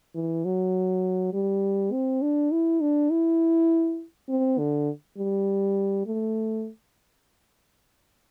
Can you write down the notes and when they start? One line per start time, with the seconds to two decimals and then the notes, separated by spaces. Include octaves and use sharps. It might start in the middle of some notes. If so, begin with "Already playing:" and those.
0.15 E3
0.45 F#3
1.33 G3
1.92 C4
2.22 D4
2.52 E4
2.81 D4
3.11 E4
4.29 C4
4.58 D3
5.18 G3
6.06 A3